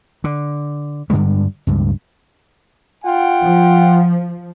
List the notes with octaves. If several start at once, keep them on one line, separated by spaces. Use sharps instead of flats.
D3
G2 D3 G3 G#3
C#2 G2
F4 F#5 G5
F3